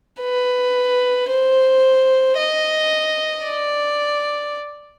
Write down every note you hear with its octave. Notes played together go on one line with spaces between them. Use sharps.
B4
C5
D#5
D5